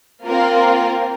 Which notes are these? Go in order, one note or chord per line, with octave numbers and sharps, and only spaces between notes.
A#3 C4 F4 A#4